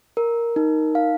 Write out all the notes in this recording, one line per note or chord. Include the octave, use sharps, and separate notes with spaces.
A#4
D#4
F5